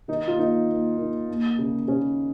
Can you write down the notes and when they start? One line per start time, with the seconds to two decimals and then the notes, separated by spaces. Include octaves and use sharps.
0.08 D#3 D#4
0.28 F4
0.38 D#2 D#4
0.69 D#2
0.98 D#3
1.28 D#2
1.59 C#3
1.88 C#3 C#4